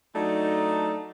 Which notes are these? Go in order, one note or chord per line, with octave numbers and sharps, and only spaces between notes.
F#3 A3 D4 D#4